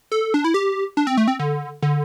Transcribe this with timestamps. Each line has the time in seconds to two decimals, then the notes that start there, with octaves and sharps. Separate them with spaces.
0.12 A4
0.34 D4
0.44 E4
0.54 G4
0.97 D4
1.07 C4
1.17 A3
1.28 C4
1.39 D3
1.82 D3